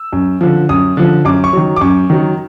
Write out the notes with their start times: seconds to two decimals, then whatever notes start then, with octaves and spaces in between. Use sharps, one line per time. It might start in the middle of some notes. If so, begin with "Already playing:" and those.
Already playing: E6
0.13 F#2
0.41 D3 F3
0.69 F#2 D#6
0.97 D3 F3
1.25 F#2 D6
1.44 C#6
1.53 D#3 F#3
1.76 D6
1.81 F#2 C#6
2.10 D#3 F#3